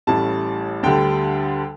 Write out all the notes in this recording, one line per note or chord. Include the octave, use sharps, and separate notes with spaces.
A1 A2 G3 A5
D2 D3 G3 G5